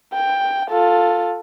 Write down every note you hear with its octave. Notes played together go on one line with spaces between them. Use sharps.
G5
F4 A4